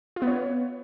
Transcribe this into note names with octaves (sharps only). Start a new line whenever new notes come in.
F4
B3
C#5